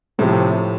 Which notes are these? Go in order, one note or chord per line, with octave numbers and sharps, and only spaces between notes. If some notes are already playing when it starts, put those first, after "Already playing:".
A2 C3 F3 A3